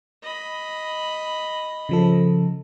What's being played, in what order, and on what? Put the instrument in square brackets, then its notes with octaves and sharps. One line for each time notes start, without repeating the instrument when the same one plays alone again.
[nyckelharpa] D#5 B5
[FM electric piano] C#3 F3 A4